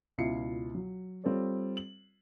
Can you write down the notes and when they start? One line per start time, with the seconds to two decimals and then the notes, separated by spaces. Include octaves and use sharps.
0.18 C#2 B2 E4 F4 C7 C#7
0.75 F#3
1.24 G3 C4 F4 A4 C#5
1.77 F#7